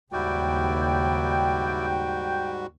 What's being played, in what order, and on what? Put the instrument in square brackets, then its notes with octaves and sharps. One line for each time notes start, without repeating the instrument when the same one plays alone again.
[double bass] D#2 C#3 [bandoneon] G#2 G3 F#4 [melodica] E4 D5 [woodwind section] G5